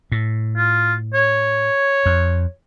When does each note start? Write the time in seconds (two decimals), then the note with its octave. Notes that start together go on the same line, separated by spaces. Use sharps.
0.12 A2
0.57 F4
1.14 C#5
2.06 F2